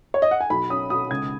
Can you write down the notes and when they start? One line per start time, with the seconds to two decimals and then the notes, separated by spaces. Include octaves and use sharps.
0.14 C#5
0.22 D#5
0.31 F#5
0.41 G#5
0.50 B1 B5
0.70 C#4 D#6
0.90 B2 D#6
1.11 C#2 G#6